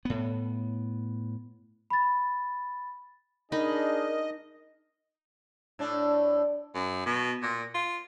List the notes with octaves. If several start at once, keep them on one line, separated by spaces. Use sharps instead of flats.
A2 B3
B5 A6
D4 D#4 G#4 A#4 D#5 B5
A2 D4
F#2
B2
A#2
F4